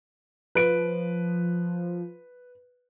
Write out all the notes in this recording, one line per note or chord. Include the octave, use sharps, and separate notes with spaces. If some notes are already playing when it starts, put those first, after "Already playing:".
F3 B4 D7